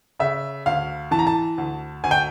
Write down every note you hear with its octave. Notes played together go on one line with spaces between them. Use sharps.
C#3 E5
D2 F5
E3 A5
A#5
A5
D2
D2 G#5
G5